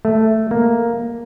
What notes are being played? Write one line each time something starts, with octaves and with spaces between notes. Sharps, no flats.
A3
A#3